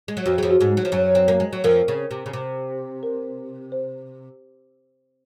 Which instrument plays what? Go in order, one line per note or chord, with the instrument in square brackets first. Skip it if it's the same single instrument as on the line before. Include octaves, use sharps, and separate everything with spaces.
[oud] G#3
F#3
[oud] F2 F3 [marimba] F#4
[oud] F#3 [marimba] G#4
[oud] F2 F3
[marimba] F#4
[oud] G#2 G#3
F#3
F3
F#2 F#3
C4
A#3
G#3
F#3
[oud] F2 F3 [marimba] A#4
[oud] C#3
C3
C#3
C3
[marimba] A#4
C5